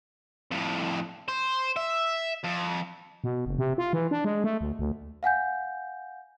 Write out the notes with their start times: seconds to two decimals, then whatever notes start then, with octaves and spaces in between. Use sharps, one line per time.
0.52 F2 A2
1.29 C5
1.77 E5
2.44 F2
3.24 B2
3.46 F#1
3.58 C3
3.78 F4
3.93 E3
4.11 D4
4.25 G#3
4.44 A3
4.61 D2
4.79 D2
5.23 F5 F#5 G#5 G6